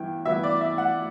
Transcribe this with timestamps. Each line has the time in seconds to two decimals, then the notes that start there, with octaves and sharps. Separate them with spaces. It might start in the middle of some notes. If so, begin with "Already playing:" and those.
Already playing: G2 E3 B3 E4 G5
0.25 G2 E3 B3 E4 E5
0.43 D5
0.61 E5
0.78 F#5